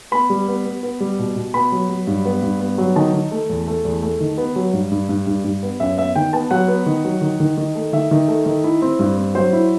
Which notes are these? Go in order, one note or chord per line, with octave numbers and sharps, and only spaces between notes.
B3 B5
G3
B3
B3
B3
G3
B2
B2
B3 B5
F#3
F#3
G2
B3
G2
B3
F#3
D#3 A5
D#3
A3
E2
A3
E2
A3
D#3
B3
F#3
G2
G2
G2
G2
G2
B3
F#2 E5
B3 E5
D#3 G5
B3 A5
F#3 F#5
B3
D#3
F#3
D#3
D#3
D#3
A3
D#3 E5
D#3
A3
D#3
E4
C4
G2
C4
F#3 C5
E4